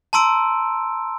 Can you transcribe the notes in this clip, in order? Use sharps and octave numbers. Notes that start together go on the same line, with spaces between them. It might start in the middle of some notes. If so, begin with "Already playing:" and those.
A5 A#5 C6 E6 D7